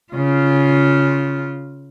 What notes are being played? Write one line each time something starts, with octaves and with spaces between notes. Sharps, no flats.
C#3 F4